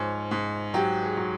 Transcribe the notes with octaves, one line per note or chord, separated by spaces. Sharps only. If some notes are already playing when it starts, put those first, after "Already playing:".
Already playing: G#2 F3 C#5
G#2
F#3 G4
G#4
F#3